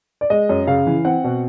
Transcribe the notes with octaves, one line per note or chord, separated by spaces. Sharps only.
D5
G#3 D#5
F#2
C#3 F5
E3
C4 F#5
B2